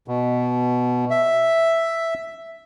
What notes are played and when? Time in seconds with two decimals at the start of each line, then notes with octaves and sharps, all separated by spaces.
0.08 B2
1.11 E5